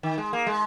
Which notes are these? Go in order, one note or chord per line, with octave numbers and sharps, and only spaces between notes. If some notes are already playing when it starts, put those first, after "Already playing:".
D#3
G#3
A#3
G#3